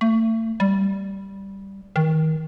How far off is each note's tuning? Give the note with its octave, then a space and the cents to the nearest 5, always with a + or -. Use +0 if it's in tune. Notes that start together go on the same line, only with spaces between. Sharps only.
A3 +35
G3 -5
D#3 +25